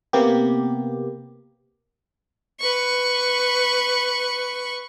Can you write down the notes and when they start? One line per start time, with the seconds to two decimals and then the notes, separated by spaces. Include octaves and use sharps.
0.13 C3 A#3 B3 G4
2.60 B4 C#6